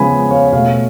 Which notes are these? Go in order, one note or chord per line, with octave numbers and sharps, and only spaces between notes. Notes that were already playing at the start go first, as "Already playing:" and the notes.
Already playing: C#3 F3 G#3 B3 G#5 B5
C#5 F5
B2 A3 C#5 F5